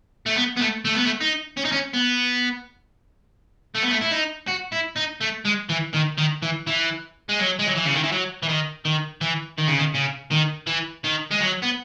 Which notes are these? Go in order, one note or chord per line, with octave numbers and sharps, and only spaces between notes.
A3
B3
B3
A3
A3
B3
A3
D#4
C#4
D#4
C#4
B3
A3
B3
A3
E4
D#4
F#4
E4
D#4
A3
G#3
E3
D#3
D#3
E3
E3
G#3
F#3
G#3
F#3
E3
C#3
D#3
E3
F#3
E3
D#3
D#3
E3
D#3
C#3
D#3
C#3
D#3
E3
D#3
G#3
F#3
B3